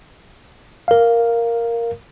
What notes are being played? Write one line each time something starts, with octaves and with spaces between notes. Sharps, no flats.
A#4 F5